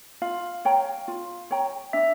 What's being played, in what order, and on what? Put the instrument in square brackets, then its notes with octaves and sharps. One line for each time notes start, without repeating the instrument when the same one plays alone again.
[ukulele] F4 [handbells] F5
[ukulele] C#5 G5 A#5
F4
C#5 G5 A#5
[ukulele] D4 [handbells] E5